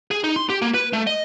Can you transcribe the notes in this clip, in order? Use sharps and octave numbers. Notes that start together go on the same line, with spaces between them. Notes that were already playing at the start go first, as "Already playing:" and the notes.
G#4
D#4
C6
G4
A#3
B4
A3
D#5